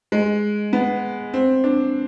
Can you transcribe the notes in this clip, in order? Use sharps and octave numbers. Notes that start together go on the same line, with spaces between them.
G#3
B3
C4
D4